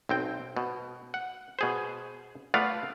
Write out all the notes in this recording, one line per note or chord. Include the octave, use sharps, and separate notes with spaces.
B1 C4 G5
B2
F#5
B2 G#4 C5
A3 B3 F4 D5 F5 F#5